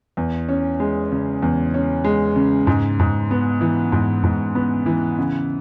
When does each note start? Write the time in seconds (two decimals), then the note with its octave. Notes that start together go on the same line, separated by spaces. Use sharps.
0.17 E2
0.49 C#4
0.80 G#3
1.12 C#3
1.42 E2
1.74 C#4
2.04 G#3
2.36 C#3
2.67 G#2
2.99 G#2
3.31 B3
3.61 E3
3.92 G#2
4.23 G#2
4.55 B3
4.86 E3
5.18 C#3